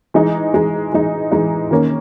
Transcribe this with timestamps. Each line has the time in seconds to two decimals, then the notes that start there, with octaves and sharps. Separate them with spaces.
0.14 E3 G#3 D#4
0.53 E3 G#3 D#4
0.92 E3 G#3 D#4
1.32 E3 G#3 D#4
1.71 D#3 A#3 C#4